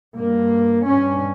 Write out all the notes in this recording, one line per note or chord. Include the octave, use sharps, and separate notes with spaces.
G2 A#3
G2 C#4